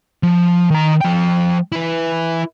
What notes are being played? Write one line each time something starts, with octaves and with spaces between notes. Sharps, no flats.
F3
D#3 A#5
F3 G5
E4 B4